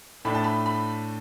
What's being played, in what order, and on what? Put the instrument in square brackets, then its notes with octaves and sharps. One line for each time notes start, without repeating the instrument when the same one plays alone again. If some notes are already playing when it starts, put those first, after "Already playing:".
[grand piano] A2 A3 D4 [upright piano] B5
[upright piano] A5
B5
B5